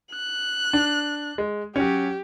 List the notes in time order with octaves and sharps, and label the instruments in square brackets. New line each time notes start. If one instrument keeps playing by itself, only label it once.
[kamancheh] F#6
[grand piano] D4
G#3
[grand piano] F#3 C#4 [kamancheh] G4